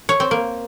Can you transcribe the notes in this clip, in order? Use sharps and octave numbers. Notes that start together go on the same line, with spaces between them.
C#5
C4
A#3